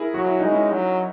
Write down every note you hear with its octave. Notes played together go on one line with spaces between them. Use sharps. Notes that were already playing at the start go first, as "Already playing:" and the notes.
Already playing: E4 G#4 A#4
F#3 F#4
E4
G#3 D#4
C#4 E4
F#3